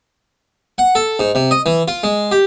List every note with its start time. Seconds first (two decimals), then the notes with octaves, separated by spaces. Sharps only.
0.78 F#5
0.95 A4
1.20 G#2
1.35 C3
1.51 D#5
1.66 E3
1.88 F4
2.04 G#3
2.31 G4